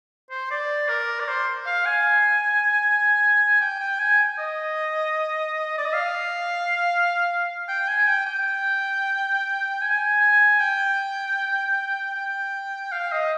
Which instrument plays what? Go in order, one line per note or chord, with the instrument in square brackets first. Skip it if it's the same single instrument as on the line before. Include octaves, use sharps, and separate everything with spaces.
[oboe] C5
D5
A#4
D5
C5
F5
G#5
G5
G5
G#5
D#5
D5
D#5
F5
G5
G#5
G5
G5
G#5
G#5
G5
G5
F5
D#5